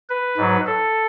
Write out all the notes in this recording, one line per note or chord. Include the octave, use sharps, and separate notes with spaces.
B4
G#2 F#3
A4